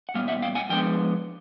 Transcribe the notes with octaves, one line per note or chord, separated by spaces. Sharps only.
F#5
A#2 G3 B3 F5
E5 F#5
F5 G5
F#5 G#5
A2 F3 G#3 B3 D4 G5